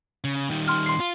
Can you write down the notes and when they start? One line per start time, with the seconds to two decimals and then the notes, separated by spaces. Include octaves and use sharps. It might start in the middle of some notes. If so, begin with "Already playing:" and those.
0.24 C#3
0.51 D#3 G3
0.68 C6 F6
0.86 C6 C7
1.00 F4